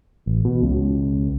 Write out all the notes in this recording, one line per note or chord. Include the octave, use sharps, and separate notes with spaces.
A1
B2
C#2